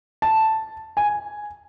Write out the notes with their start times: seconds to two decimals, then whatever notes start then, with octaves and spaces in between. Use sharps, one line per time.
0.22 A5
0.97 G#5